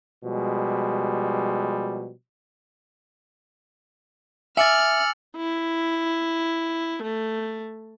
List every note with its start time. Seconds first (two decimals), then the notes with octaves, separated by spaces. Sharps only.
0.22 B2 F3 G3 G#3
4.57 E5 G#5 D6 E6 F6 A6 C#7 F#7
5.37 E4
7.03 A3